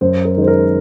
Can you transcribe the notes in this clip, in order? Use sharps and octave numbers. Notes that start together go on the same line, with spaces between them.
F#2 C5
A#4
D#3 G#3 C5
A#4